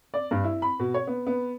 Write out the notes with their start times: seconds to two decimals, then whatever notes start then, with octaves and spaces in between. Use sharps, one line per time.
0.14 D5
0.31 G2
0.44 E4
0.62 B5
0.79 B2
0.94 C#5
1.07 B3
1.27 B3